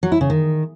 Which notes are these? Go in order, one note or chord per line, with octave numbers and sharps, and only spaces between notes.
F#3
E4
C#3
D#3